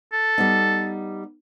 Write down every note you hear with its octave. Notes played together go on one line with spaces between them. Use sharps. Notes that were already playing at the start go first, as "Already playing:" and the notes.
A4
G3 B3 D#4